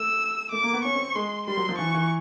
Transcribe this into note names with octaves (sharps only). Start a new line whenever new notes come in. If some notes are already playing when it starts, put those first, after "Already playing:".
Already playing: A3 E6
A3 D6
A#3
B3
C#4 C#6
C4
G#3 C6
G3 C6
F#3
F3
E3 C#6
E3